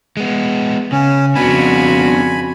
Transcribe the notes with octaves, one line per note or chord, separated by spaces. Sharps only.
G#3 B3
C#3 C#4
F2 C#3 B3 D4 F#4 G#5 B5